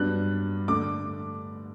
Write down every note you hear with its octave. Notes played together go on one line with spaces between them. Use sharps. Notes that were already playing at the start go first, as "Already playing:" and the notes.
Already playing: G2 F#3 B3 D4 F#6
D3 A3 D4 D6